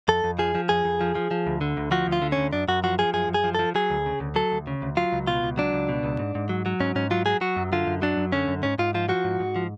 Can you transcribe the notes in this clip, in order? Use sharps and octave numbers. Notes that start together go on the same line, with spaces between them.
F2 A4
F2
F3 G#4
F3
F2 G#4
F2
F3
F3
F3
D2
D3
D2
F3 F#4
D2
F4
D3
C#4
D2
F#2 D4
F#2 F#4
F3 F#4
F3 G#4
F#2 G#4
F#2
G#4
F3
F3 A4
F#3 G#4
D2
C#3
D2
F#3 A4
D2
C#3
D2
F#3 F4
C#2
B2 F4
C#2
F#3 D4
C#2
B2
C#2
G#2
G#2
F#3
F#3
G#2 C#4
G#2 C#4
F#3 F4
F#3 G#4
F#3 F#4
F#2
D3 F4
F#2
F#3 D4
F#2
D3 C#4
F#2
G#2 C#4
G#2 F4
F3 F4
F3 F#4
G#2
G#2
F3